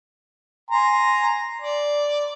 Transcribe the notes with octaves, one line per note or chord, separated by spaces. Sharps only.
G#5 A#5 C6
D5